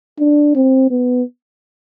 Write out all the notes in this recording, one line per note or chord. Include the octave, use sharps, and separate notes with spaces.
D4
C4
B3